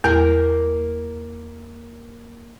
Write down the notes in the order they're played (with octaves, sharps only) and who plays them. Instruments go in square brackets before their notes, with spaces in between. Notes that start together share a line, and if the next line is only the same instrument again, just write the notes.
[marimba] E2 [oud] A#3 A#4